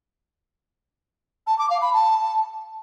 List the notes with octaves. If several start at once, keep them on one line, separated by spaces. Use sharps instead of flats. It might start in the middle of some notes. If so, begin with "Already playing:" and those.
A5
D6
F5
B5
A5